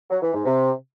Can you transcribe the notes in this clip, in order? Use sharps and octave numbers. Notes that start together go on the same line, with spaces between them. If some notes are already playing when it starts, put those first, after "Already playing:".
F#3
E3
G#2
C3